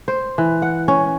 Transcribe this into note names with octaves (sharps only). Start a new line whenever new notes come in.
C5
E3
F#5
C#4